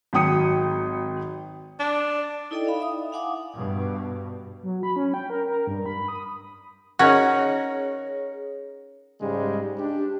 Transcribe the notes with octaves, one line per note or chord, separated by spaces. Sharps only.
G#1 F#3 G5 D#6 C#7
D4
D#4 E4 A4 D5 D#5 G5
D5 F5 B5
E5 D#6
F5 F#5 G#5 D6 D#6
G2 B2
F#3
B5
C#4
G5
A#4
A#4
G2
B5
D#6
C#4 D#4 F#4 G#4 A#4 C#5 F#5
G#2 C#3 G3 G#3
D4 G4